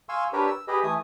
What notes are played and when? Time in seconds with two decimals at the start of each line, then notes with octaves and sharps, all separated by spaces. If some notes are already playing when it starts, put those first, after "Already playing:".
0.09 F5 G#5 C6 C#6 E6
0.33 D4 G4 A#4 B4 C#5
0.47 E6
0.68 G4 G#4 B4 D#5
0.83 E3 A3 G#5 D#6